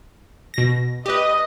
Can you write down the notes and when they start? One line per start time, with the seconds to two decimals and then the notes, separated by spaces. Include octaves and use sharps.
0.54 B2 A#6
1.06 G4 B4 D#5